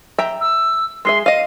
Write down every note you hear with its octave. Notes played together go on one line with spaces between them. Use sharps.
E5 G5 A#5
E6
G#3 G#4 E5 C6
D#5 F5 D#7